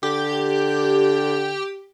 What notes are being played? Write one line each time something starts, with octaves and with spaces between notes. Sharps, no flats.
D3 G4